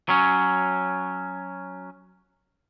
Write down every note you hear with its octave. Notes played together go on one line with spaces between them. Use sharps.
F#3 C#4